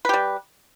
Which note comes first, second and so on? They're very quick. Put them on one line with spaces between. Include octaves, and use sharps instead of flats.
B4 G4 G3